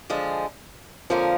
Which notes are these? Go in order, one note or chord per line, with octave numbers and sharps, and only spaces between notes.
D3 F3 G#3
F2 D3 F3 A#3 C#4